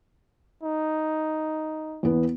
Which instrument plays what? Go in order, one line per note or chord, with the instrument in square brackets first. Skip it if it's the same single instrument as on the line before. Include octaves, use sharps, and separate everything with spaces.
[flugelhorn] D#4
[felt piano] E2 B3